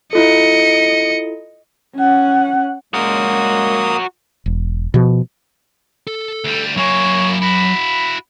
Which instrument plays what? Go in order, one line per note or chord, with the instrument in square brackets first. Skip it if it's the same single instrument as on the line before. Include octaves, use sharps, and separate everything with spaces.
[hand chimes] E4 F4 A4 [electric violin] D#5 C#7
[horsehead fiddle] C#4 F#5
[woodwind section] A#2 C#3 G#3 [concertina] A#3 D#6 [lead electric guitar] F#4 A#4
[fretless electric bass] E1
B2 F3
[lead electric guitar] A4
[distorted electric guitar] D2 G3
[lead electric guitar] F#3 G#5 [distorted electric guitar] A#3 E4 [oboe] C#5
[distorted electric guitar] E4 F#4 [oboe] B5